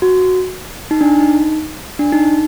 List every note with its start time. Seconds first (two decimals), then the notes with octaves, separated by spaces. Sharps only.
0.02 F#4
0.91 D#4
1.01 D4
1.21 D#4
1.99 D4
2.12 D#4
2.26 D#4